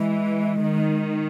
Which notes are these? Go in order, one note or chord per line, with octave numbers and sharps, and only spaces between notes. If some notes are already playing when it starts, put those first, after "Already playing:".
Already playing: E3 G#3
D#3